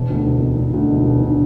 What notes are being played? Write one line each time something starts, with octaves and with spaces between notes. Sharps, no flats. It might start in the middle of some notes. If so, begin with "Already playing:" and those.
Already playing: E1
D2
E1
E1
E1
D2
E1
E1
D3